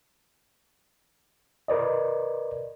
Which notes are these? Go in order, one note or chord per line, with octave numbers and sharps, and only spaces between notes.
A#4 B4 D5 D#5